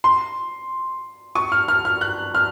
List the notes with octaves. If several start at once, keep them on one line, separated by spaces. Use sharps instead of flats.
C6
C#6
F6
F6
F6
F#6
F6